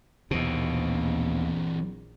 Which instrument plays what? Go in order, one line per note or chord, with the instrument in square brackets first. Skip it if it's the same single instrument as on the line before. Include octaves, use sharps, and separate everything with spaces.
[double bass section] A#1 [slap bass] D#2 B2 [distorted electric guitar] E3 C4